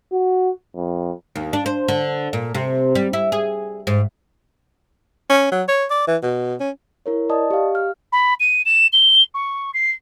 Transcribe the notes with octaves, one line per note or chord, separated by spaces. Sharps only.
F#4
F2
D#2
D4
C5
D3
A#2
C3
G3
E4
G#4
G#2
C#4
F#3
C#5
D5
E3
B2
C#4
E4 A#4 C#5
D5 D#5 A5 D#6
G4 F5
F6
B5
D#7
E7
G7
C#6
C7